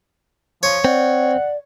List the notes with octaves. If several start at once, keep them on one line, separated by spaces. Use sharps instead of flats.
F3 C#5
C4 D5 F#5